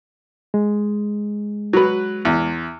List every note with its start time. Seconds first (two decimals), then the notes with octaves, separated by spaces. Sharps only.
0.54 G#3
1.73 F#3 B4
2.25 E2